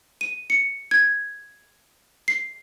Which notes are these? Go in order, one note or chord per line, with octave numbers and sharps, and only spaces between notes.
D#7
C#7
G#6
C7